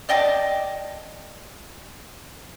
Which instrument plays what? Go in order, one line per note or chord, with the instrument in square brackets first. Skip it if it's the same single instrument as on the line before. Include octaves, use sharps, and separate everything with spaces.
[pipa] D5 D#5 G5 A5